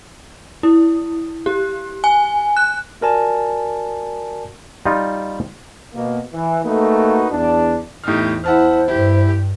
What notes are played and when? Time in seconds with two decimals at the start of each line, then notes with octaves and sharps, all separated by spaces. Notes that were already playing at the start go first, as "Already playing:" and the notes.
0.63 E4
1.46 G4
2.04 G#5
2.57 F#6
3.01 F4 F#4 A#4 D5 G#5 A5
4.86 G3 D#4 F4
5.95 B2 A#3
6.33 E3
6.64 A3 A#3 D#4 F#4 B4
7.31 E2 D4
8.04 E2 A2 D#4 G4 F6
8.44 E4 C5 F#5 A5 F6
8.88 G2 E4 G4